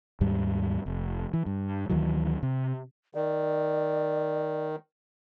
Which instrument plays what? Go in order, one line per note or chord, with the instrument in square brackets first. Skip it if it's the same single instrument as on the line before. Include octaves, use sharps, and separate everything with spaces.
[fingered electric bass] D#2 G#2 G3
F1
E3
G2
D2 D#3 E3 F#3
C3
[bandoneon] D#3 [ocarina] D5